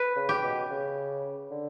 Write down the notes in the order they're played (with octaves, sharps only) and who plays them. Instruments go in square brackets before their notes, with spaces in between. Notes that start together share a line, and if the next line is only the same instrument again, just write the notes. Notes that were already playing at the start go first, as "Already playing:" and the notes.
Already playing: [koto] B4
[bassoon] C#3
[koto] G4
[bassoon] B2
C#3
D3